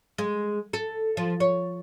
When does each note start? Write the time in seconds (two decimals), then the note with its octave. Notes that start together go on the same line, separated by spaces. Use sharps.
0.18 G#3
0.73 A4
1.17 F3
1.40 C#5